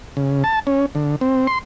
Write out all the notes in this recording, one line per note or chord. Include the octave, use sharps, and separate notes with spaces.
C#3
A5
C#4
D3
C4
C6